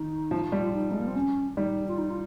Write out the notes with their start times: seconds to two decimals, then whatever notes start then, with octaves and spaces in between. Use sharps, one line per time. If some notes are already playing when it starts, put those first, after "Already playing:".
Already playing: D#3 D#4
0.31 F3
0.52 G3
0.62 F4
0.73 D#4
0.91 G#3
0.99 A#3
1.07 C4
1.15 C#4
1.57 G3 D#4
1.88 F4
1.98 D#4
2.10 F4